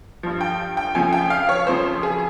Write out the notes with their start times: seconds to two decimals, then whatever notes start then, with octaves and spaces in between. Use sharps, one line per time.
0.23 G2 F3
0.41 G5
0.77 G5
0.95 F2 C#3 F3 G#5
1.13 G5
1.30 F5
1.49 C#5
1.67 F2 C#3 F3 C5
2.03 G#4